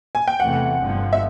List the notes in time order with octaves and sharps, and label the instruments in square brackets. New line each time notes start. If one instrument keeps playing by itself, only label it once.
[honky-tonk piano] G#5
G5
[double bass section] E2 C3 E3 A3 C4 [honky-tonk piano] F#5
[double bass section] G1 G2 D3 F3
[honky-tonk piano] E5